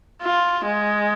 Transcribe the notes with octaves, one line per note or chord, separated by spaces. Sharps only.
F4
G#3